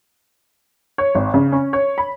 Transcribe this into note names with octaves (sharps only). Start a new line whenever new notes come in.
C#5
G#1
C#3
C#4
C#5
B5